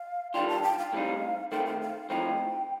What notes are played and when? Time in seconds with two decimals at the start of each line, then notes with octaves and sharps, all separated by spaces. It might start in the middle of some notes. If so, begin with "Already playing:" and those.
Already playing: F5
0.34 D#3 G3 D4 F4 G5
0.49 A5
0.63 G5
0.78 F5
0.93 A2 G3 C4 D#4
1.51 D#3 A3 C4 G5
1.66 G5
1.81 F5
2.10 A2 F3 C4 D#4 G5